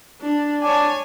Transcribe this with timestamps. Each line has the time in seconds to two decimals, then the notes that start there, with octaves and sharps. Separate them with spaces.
0.21 D4
0.62 D4 C#5 G#5